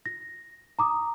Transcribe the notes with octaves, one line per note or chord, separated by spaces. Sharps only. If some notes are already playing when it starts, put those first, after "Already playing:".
A#6
A#5 D6 D#6